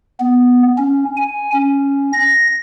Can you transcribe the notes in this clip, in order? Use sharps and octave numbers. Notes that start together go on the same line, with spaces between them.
B3
C#4
G#5
C#4
A#6